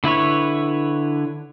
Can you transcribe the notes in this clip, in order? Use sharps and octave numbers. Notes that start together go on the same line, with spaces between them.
D3 E4 B4 C#5